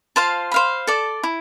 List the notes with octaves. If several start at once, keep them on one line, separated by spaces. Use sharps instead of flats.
F4 C5 F5 A5
C5 F5 B5
A4 D5 A5
E4